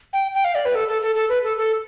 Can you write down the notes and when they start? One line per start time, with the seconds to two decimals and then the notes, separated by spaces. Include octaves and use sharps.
0.13 G5
0.34 G5
0.45 F5
0.55 D5
0.65 B4
0.75 A4
0.88 A4
1.02 A4
1.15 A4
1.29 B4
1.43 A4
1.57 A4